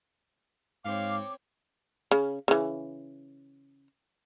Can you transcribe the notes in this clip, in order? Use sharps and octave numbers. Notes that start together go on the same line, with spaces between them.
G#2 C4 C#5 F5 D6
C#3
C#3 E3